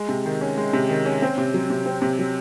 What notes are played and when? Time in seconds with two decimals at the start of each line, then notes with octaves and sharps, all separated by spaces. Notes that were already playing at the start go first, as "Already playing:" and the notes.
Already playing: G#3
0.09 C3
0.25 D#3
0.41 C#4
0.57 G#3
0.73 C3
0.89 D#3
1.06 C#4
1.22 C4
1.38 C3
1.54 F#3
1.70 C3
1.86 C4
2.02 C3
2.19 F#3